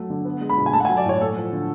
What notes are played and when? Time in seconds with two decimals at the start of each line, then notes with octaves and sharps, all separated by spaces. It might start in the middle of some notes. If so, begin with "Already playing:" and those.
Already playing: F#3 A3
0.10 D3
0.25 B3
0.41 G#3
0.49 B5
0.58 B2
0.66 G#5
0.73 A3 A5
0.80 F#5
0.85 F#3 G#5
0.97 D5
1.05 A2 C#5
1.21 A3 A4
1.37 F3
1.53 D3